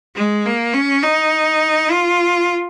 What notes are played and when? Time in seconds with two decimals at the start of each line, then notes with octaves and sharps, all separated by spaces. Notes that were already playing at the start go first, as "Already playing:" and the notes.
0.15 G#3
0.45 A#3
0.74 C#4
1.03 D#4
1.91 F4